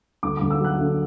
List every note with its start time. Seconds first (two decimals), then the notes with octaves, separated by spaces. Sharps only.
0.23 D2 D6
0.37 D2 D6
0.50 E6
0.60 F#3 F#6
0.79 D3